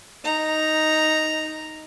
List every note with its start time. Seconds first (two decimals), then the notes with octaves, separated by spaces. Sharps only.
0.24 D#4 A#5